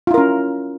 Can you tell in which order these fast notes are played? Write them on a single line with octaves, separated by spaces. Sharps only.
F4 E4 A#4 C#4